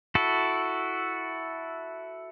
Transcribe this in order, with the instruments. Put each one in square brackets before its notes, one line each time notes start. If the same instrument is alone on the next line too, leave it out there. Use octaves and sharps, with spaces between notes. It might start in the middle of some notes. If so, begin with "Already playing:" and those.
[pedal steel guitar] E4 F#4 A4